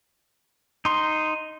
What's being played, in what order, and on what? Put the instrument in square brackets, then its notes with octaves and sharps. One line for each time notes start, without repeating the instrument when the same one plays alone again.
[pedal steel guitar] D#4 C6